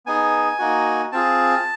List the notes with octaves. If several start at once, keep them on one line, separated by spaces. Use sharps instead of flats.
B3 D#4 G#4 G#5
A#3 D#4 F#4
C4 F4 G#4 A5